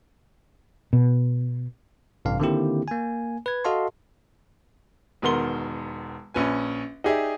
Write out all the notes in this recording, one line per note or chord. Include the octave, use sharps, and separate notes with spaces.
B2
A1 G2 C3 F5
D3 D#3 A#3 C4 E4 G4
A#3 G#5
B4 G#6
F#4 A4 D#5 F5 A5 C6
E1 D#3 B3 A#4 C6 G7
A#1 C#4 B4 G#5
D#4 G4 G#4 D5 E5